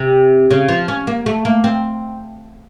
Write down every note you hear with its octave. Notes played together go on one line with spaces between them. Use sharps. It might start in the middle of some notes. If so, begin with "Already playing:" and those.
Already playing: C3
C#3
F3
C#4
A#3
A3
A#3
C4